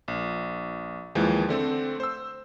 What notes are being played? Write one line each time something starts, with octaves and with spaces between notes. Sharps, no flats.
A#1
D#2 E3 F3 G#3
D3 A3 C4
C5 E6